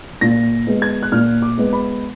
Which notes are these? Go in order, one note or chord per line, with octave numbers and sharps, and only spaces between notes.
A#2 A#6
G#3 B3
G#6
F#6
A#2 F6
D6
G#3 B3
B5